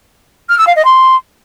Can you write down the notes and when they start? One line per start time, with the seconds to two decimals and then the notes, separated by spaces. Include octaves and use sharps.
0.49 F6
0.58 E6
0.67 F5
0.76 D#5
0.84 C6